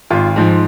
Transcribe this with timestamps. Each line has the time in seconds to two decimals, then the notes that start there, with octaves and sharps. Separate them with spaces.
0.10 G#1 F4
0.36 G#2 F3